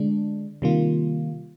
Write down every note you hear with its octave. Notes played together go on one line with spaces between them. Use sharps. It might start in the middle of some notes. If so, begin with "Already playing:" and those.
Already playing: D3 G#3 D4
C3 D#3 G3 A#3 F4